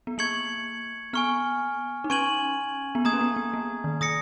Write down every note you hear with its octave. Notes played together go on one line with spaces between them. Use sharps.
B3
A#3 C#6 G#6 C#7 F#7
B3 G#5 C#6 F6
D#4
C#4 G#5 C#6 G#6 D#7 F#7
B3
A#3 A#5 D#6 G#6
C#4
B3
B3
A#3
D#3
D#3 D#6 A#6 C#7